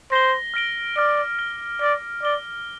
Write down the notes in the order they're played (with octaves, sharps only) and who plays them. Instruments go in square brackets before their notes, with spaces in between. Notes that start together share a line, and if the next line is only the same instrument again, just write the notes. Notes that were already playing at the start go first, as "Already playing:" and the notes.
[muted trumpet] C5 [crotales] A#6 G7
[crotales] F6 A#6 D7 G7
[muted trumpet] D5 [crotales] D6 F6 D7 G7
[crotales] A#6 D7 G7
[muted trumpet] D5 [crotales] F6 A#6 G7
[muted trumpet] D5 [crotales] A#6 G7